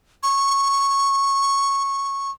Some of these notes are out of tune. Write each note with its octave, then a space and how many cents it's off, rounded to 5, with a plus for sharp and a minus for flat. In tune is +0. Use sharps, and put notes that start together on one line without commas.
C#6 -10